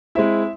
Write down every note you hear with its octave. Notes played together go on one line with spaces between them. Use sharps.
G#3 C4 E4 E5